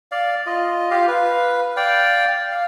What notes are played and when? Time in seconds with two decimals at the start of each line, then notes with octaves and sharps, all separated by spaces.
0.12 D5 F5
0.46 F4 D#5
0.91 F4 G4 F5
1.08 B4 F5
1.77 D5 F5 G5
2.52 F5